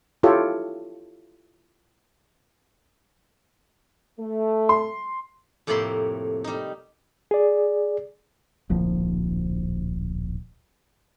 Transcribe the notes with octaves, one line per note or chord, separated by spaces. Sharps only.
E4 F4 G4 A4 C#5
A3
C6
F2 A2 C3 A#3 B5 C6
G3 D#4
G#4 D5
D1 A#1 F3